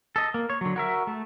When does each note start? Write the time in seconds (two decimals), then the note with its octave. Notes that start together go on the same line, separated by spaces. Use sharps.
0.16 A4 D#5
0.34 A#3
0.50 C#5
0.61 D3 F#3
0.76 F#4 A#4 E5
1.07 A3